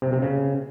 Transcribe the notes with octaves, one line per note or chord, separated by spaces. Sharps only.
C3
C3
C#3